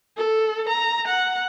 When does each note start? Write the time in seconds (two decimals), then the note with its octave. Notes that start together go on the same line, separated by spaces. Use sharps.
0.17 A4
0.69 A#5
1.07 F#5